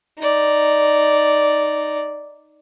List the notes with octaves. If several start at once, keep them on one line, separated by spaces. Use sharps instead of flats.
D#4 D5